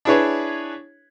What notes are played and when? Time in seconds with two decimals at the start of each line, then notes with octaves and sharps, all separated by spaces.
0.05 D4 E4 G#4 B4 C#5